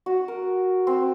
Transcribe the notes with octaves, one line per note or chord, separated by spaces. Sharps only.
F#4
A#4
C4